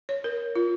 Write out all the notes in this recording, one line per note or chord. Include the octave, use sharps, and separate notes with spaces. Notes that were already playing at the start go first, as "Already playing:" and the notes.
C#5
A#4
F4